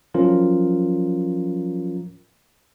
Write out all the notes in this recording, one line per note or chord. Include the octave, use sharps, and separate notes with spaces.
F3 F#3 C#4 F4 A#4